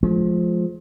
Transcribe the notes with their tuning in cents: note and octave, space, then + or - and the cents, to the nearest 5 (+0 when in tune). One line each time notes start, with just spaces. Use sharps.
F3 +10 G#3 +40